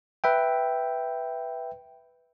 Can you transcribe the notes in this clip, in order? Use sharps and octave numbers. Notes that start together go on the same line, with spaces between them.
B4 E5 G5